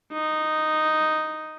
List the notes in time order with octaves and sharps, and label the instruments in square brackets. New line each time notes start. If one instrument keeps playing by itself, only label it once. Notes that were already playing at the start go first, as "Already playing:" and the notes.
[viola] D#4